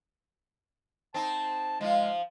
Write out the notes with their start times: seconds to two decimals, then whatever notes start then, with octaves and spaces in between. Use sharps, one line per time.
1.14 C4 D#4 A5
1.81 F3 G#3 F4